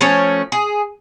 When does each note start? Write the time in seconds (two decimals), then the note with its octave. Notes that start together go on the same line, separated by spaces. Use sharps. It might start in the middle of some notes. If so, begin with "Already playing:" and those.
0.01 F3 A3 C#4 C#5
0.52 G#4